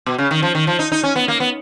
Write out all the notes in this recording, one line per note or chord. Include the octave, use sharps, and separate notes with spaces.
B2
C#3
D#3
F3
D#3
F3
D#4
D#4
C#4
B3
A#3
B3